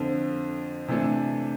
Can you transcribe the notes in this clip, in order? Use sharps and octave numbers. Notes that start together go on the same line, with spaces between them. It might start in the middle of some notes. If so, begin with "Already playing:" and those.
Already playing: F2 D3 F3
C3 E3 A3 D4